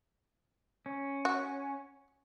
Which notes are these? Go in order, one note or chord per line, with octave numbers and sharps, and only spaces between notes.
C#4
F#4